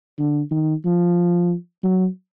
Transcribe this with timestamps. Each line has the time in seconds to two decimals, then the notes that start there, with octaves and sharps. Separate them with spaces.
0.19 D3
0.51 D#3
0.85 F3
1.84 F#3